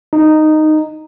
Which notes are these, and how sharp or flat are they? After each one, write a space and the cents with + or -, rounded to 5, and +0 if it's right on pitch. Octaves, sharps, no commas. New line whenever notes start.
D#4 -10